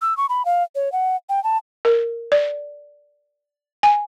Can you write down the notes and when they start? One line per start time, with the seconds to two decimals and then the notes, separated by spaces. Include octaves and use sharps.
0.02 E6
0.17 C#6
0.29 B5
0.45 F5
0.75 C#5
0.92 F#5
1.29 G5
1.44 A5
1.85 A#4
2.32 D5
3.83 G#5